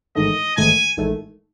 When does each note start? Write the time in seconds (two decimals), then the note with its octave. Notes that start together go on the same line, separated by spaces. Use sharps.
0.15 A1 G#2 D#3 A3 D#5
0.57 A1 G#2 D#3 A3 G#5
0.97 A1 G#2 D#3 A3